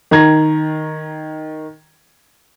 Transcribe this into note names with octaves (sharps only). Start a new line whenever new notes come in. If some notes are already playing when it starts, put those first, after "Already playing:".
D#3 A#5 G#6 A#6